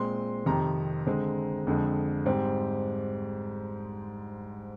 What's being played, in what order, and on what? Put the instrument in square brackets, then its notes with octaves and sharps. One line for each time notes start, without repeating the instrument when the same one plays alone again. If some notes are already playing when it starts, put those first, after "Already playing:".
Already playing: [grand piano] A#2 G#3 C4 C6
F2 C3 D#3 A#5
D3 G#3 C4
F2 D3 G#3
G#2 G3 C4